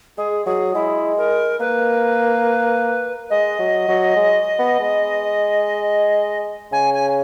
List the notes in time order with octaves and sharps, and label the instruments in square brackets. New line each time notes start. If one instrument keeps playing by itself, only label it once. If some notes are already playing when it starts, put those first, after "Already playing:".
[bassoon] G#3 [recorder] G#4
[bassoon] F#3 [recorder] G#4
[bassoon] G#3 [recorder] E4
[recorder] A#4
[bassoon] A#3 [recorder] B4
[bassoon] G#3 [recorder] D#5
[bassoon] F#3
F#3
G#3
B3
G#3
[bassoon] C#3 [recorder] G#5
[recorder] G#5